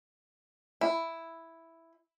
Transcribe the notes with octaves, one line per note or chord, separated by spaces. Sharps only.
E4